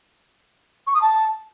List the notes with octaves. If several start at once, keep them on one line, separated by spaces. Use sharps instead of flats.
C#6
D#6
A5